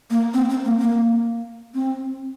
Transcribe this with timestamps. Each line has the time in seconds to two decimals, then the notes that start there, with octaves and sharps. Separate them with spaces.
0.10 A#3
0.34 C4
0.50 C4
0.65 A#3
0.80 A#3
1.74 C4